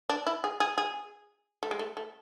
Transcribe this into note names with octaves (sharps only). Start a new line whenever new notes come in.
D4
E4
G#4
G#4
G#4
A3
G#3
A3
A3